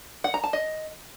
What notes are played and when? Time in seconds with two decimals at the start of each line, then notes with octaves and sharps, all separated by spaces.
0.24 F#5
0.34 A#5
0.44 A5
0.53 D#5